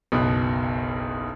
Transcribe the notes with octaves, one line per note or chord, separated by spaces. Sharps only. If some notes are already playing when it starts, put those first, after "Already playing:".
F#1 B1 B2